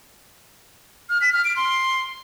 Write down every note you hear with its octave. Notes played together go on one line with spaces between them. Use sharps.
F6
B6
F6
D7
C6